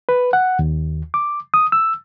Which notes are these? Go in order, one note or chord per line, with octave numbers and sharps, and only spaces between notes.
B4
F#5
D#2
D6
D#6
E6